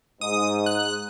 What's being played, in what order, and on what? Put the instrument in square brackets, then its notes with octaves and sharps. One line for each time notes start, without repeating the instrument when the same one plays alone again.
[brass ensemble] G#2 [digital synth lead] D#6
[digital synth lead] F#6